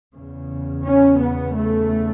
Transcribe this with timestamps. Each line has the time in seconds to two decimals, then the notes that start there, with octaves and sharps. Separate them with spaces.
0.14 E2 C#3
0.85 C#4
1.20 B3
1.55 A3